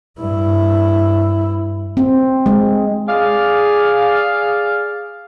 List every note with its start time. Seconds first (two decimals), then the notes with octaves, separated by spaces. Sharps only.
0.19 G2 E4
1.97 C4
2.46 G#3
3.08 G#4 D5 F5